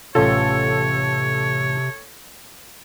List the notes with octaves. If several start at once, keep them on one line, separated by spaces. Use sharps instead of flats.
A1 C3 C#4 F4 A4 C#5